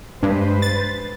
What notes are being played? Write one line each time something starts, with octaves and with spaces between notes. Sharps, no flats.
G2 G#3 B4 C5
A6